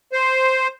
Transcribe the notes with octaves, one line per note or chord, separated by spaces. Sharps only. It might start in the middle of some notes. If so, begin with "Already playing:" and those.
C5